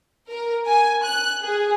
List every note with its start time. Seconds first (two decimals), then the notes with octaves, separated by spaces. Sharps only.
0.30 A#4
0.67 G#5
1.05 F#6
1.44 G#4